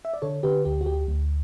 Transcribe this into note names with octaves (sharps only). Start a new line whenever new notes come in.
E5
D5
D3 A4 C#5
D3 G4 B4
D2 G4
F#4
D2 G4
D2